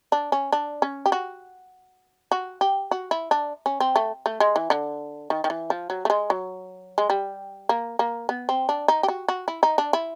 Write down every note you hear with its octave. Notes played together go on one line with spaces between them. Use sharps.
D4
C#4
D4
C#4
G4
F#4
F#4
G4
F#4
E4
D4
C#4
C4
A3
A3
G#3
E3
D3
D#3
D#3
E3
F3
F#3
A3
G#3
F#3
G#3
G3
A#3
A#3
B3
C4
D4
D#4
G4
F#4
F#4
E4
D#4
D4
E4